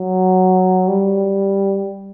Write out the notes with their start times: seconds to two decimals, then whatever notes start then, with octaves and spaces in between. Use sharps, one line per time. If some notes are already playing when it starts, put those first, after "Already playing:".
Already playing: F#3
0.88 G3